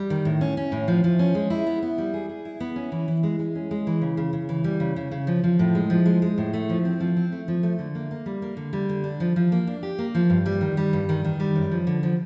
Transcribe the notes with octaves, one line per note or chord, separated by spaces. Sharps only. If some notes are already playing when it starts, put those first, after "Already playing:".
Already playing: G3
D#3
A2
C#4
C#4
A2
F3
F3
C#4
G#3
E4
B3
B3
G3
G#4
G#4
E4
B3
C#4
E3
E3
G#3
G#3
C#4
G#3
E3
C#3
C#3
C#3
E3
G3
C#3
C#3
C#3
F3
F3
A2
G#3
F3
G#3
G#3
A2
A3
F3
C4
F3
C4
A3
F3
A3
D3
A#3
A#3
G3
A#3
D3
G3
D3
D4
F3
F3
A#3
D4
G4
A#3
F3
G2
G3
D#3
G3
G2
D#3
D#3
G3
F#2
F3
D3
F3